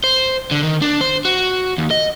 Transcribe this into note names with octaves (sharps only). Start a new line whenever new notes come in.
C5
D3
D#3
D4
C5
F#4
D#2
D#5